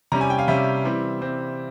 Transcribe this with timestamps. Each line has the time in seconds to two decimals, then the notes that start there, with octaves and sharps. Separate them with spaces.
0.12 C3 G3 C#4 A#5
0.21 G#5
0.30 G5
0.39 F5
0.48 C3 G3 C#4 E5
0.85 E3 G3 C4
1.21 E3 G3 C4